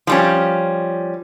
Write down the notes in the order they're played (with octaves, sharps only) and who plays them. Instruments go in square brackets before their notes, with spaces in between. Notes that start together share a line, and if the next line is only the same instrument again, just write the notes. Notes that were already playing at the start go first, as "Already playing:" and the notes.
[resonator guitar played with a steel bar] F3 G3 C#4